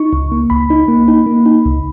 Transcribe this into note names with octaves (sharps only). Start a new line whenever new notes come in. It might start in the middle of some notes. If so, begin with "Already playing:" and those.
Already playing: D#4 C#6
C#2
A#3
C#2 B5
D#4
A#3
D#4
A#3
D#4
C#2